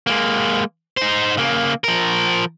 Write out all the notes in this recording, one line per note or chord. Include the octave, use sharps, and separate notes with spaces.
G#3 A#3
D#4 C5
C#3 A#3
F3 A#4